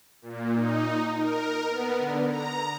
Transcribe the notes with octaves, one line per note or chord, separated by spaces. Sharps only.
A#2
D#4
A#4
B3
D3
A#5